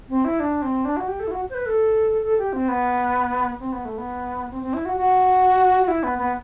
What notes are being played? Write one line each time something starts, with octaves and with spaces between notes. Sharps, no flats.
C4
E4
D4
C4
D4
F#4
G4
A4
E4
F#4
C5
B4
A4
A4
G4
C4
B3
C4
B3
A3
B3
C4
C4
E4
F#4
F#4
F#4
E4
B3
B3